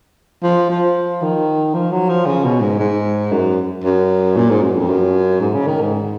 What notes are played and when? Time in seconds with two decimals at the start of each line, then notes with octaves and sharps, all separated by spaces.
0.43 F3
0.69 F3
1.22 D#3
1.74 F3
1.91 F#3
2.09 F3
2.26 C#3
2.44 B2
2.61 G#2
2.79 G#2
3.31 F#2
3.84 F#2
4.36 A#2
4.49 G#2
4.62 F#2
4.76 F2
4.88 F#2
5.40 G#2
5.54 C#3
5.67 D#3
5.81 G#2